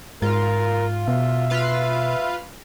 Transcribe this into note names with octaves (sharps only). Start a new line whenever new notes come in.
G#2 F4 A#4
B2 E5
F4 B4 F5